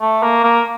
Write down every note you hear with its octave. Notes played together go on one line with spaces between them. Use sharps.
A3
A#3
A#3